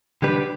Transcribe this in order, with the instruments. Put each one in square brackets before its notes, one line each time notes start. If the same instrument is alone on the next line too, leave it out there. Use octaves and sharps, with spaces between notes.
[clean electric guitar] D3 G3 D4 G4 B4